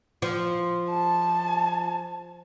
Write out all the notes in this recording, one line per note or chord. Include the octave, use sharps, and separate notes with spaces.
F3
A5